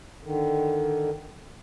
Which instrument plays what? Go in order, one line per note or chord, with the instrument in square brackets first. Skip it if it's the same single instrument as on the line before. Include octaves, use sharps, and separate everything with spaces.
[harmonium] D3 D#3